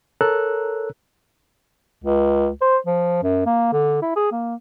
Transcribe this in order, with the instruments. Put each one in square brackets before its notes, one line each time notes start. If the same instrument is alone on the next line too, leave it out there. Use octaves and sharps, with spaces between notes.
[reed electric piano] A4 A#4 C#5 A#5 E6 F#6
[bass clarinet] C#2
C5
F3
F#2
A#3
D3
E4
G#4
A#3